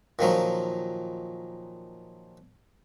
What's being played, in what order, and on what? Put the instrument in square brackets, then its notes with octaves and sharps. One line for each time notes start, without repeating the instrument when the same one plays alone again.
[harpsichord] A#2 D#3 F3 F#3